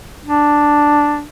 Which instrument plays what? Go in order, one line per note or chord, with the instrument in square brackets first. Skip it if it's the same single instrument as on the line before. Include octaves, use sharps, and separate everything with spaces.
[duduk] D4